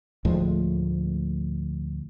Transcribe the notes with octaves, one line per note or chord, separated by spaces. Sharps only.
D2 A2 F3 G#3